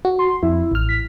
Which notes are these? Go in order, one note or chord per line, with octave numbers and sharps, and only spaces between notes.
F#4
C6
F2 E4
A1 F6
B6